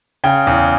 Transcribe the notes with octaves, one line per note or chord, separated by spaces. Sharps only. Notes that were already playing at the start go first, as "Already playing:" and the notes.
C#3 G5
E2